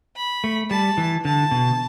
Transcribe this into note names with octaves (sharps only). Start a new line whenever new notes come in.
B5
A3
G3 A5
E3
D3 A5
B2